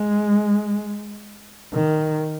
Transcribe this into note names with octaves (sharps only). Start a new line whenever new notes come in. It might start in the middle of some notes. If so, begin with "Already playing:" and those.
Already playing: G#3
D#3